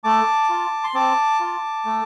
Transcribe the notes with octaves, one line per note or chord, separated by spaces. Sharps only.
A3 A5 D6
F4
C6
C4 A5 D6
F4
A3